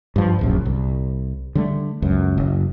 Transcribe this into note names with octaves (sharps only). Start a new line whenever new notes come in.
G2 F3
D1 A#1 F#2
C2
D3 G3 A3
C#2 F#2
F#1